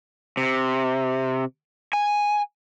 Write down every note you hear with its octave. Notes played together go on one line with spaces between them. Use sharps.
C3
G#5